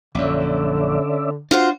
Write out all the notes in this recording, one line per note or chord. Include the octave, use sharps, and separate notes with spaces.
A#1 F#2 D3 C#4 D5 E5
D4 F4 F#4 C5